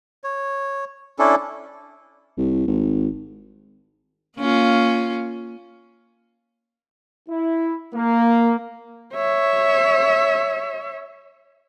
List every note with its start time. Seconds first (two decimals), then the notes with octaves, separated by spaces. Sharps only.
0.24 C#5
1.19 C#4 D4 E4 A4
2.37 C2
2.67 G#1
4.38 A#3 C#4 F4
7.29 E4
7.95 A#3
9.14 C#5 E5